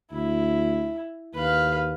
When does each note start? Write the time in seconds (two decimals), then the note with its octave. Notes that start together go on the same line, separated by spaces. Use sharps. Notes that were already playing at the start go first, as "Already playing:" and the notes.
0.12 D2 E4
1.34 D#2 B4 F5